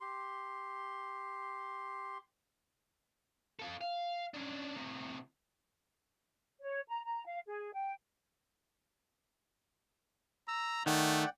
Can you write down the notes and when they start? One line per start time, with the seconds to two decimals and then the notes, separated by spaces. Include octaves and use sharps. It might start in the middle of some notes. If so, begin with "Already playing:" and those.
0.01 G4 C6
3.59 F4 A4
3.81 F5
4.34 C#4 D4
4.76 A2 C3
6.61 C#5
6.87 A#5
7.05 A#5
7.25 F5
7.47 G#4
7.73 G5
10.48 A#5 E6
10.86 D#3 A3 D5 F#5 G5